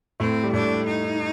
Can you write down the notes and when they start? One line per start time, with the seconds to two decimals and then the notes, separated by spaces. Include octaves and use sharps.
0.20 A2 A3 C4
0.44 G3
0.53 A2 A3 D4
0.87 D#4